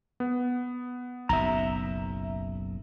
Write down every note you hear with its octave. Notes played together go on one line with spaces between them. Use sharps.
B3
F#1 B1 E5 A#5